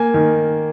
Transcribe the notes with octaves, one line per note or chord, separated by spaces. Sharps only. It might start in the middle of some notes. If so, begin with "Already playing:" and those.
Already playing: A#3 G#5
D#3